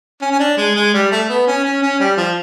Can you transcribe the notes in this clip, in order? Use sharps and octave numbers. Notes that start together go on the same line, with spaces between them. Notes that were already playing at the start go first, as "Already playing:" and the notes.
C#4
C#4
D4
G#3
G#3
G3
A3
B3
C#4
C#4
C#4
G3
F3